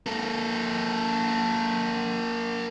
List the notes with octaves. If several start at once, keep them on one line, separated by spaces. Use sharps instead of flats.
A#3 A4